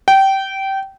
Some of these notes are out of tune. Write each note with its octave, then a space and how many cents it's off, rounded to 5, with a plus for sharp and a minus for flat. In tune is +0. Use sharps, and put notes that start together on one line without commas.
G5 -20